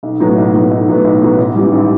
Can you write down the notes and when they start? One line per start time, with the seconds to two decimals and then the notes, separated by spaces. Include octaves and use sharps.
0.03 B1
0.20 A2 F#3 B3
0.38 B1
0.54 A2 F#3 B3
0.71 B1
0.88 A2 F#3 B3
1.04 B1
1.22 A2 F#3 B3
1.38 A1
1.56 G#2 E3 G3
1.72 A1